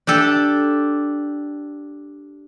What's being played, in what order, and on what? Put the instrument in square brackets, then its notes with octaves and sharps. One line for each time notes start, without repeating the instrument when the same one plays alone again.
[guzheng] D4 G4 A4